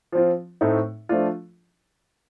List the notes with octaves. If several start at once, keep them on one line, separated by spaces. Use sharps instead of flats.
F3 C4 F4
A2 A3 C4 D#4
F3 A3 D4 F4